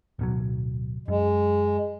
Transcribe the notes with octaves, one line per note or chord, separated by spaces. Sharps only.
D1 B2 F#3
F#2 G#3